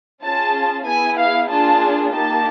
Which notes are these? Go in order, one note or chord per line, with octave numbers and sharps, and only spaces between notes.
C#4 F4 G#4 A5
B3 E4 G#4 G#5
F5
A#3 D4 F4 G#4 A5
A#3 D#4 G4 A5